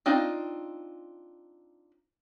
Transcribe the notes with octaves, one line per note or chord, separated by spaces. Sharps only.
C4 D4 D#4 F4